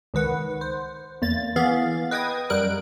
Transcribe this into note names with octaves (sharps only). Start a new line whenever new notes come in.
C#2 D#3 B4 F#5
C5
E2 A#3 A6
E3 B3 G#4 F5 A6
B4 D#5 G5 D#6 G#6
F#2 G3 A#4 F#6 D7